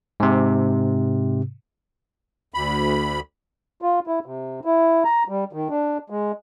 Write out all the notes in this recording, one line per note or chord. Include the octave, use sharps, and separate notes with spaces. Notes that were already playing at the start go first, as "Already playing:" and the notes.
G#2 C3
D2 B5
F4
E4
C3
E4
A#5
G3
D#3
D4
G#3